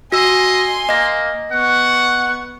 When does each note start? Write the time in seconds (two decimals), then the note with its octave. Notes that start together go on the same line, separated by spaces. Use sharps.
0.12 F#4 D#5 G#5 C6 E6
0.89 A#3 D#5 A#6
1.52 B3 F#5 C#6